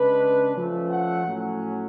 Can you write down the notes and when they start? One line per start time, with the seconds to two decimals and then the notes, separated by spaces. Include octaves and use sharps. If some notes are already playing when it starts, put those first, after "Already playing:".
Already playing: C#3 G#3 D4 B4
0.54 F3 A3 C#4
0.90 F#5
1.26 A2 F#3 C#4